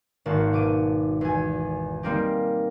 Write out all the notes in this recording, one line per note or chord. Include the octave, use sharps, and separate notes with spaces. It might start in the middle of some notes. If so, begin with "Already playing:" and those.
G#1 A#3 F#4 A5
B2 D6 D#7
E2 G#5
G3 A#3 C4 D#4 G4